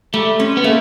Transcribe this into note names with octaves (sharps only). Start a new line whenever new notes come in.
G3 A3
C#4
B3
A3 A#3